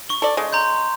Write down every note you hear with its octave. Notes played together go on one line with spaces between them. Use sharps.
C#6 G7
A4 D5
C#3 G#3
A#5 C6 G6